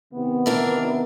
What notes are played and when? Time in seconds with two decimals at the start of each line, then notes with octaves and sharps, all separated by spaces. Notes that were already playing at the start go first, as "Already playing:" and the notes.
0.12 C3 D#3 B3
0.46 E3 D4 A#4